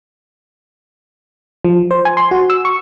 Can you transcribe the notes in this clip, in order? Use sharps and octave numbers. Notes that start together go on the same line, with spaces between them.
F3
C5
G#5
C6
F#4
E6
C#6